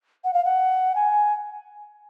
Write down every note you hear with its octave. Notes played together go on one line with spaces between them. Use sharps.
F#5
F5
F#5
G#5